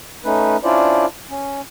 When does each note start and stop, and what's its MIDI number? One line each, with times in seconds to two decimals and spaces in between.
0.25 0.57 57
0.25 0.57 61
0.25 0.57 63
0.25 0.57 71
0.64 1.06 61
0.64 1.06 62
0.64 1.06 64
0.64 1.06 65
0.64 1.06 72
0.64 1.06 74
1.30 1.61 61